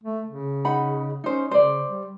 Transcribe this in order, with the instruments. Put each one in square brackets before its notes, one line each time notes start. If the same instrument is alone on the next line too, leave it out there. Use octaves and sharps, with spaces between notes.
[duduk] A3
C#3
[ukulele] D#4 F#5 B5
[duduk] C#4 [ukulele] D#4 C5
[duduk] C#3 [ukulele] C5 D5
[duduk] G3